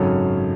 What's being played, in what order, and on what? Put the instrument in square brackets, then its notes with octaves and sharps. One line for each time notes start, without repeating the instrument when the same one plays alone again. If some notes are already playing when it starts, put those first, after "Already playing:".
Already playing: [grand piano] G#1 F#2 C#3 F#3 C#4 A4